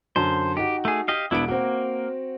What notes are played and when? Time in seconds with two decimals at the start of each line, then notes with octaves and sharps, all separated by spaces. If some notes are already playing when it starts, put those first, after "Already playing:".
0.16 F#2 D3 C5 A5
0.57 D#4 F#4 G4
0.85 A3 G#4
1.08 G4 D#5 F5
1.31 E1 B3 D4 E4 D7
1.48 A#3 C4 F#4